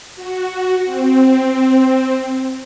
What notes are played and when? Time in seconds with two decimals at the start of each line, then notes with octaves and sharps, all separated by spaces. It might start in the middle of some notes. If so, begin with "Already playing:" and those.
0.16 F#4
0.85 C4